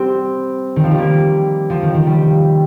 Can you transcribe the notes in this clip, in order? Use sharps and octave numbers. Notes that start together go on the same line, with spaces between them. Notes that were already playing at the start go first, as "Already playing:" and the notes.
Already playing: G3 C4
D#3
F3
G3
A#3
F3
D#3
D#3
G3